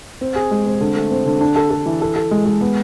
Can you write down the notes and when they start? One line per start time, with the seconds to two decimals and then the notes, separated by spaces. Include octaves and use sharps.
0.21 C4
0.35 G#4
0.51 G#3
0.66 C4
0.81 D3
0.96 A3
1.11 C4
1.26 D3
1.41 D4
1.56 A4
1.70 A4
1.86 E3
2.01 A4
2.16 A4
2.31 G#3
2.46 G#3
2.61 B3